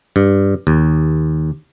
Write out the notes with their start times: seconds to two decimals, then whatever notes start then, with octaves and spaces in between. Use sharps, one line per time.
0.16 G2
0.67 D#2